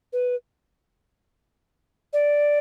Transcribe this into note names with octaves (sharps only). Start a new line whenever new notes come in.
B4
D5